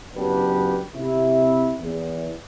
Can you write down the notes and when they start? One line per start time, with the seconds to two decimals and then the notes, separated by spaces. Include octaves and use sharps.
0.16 F#1 F#3 B3 D4 G4 B4
0.95 C3 E4
1.79 E2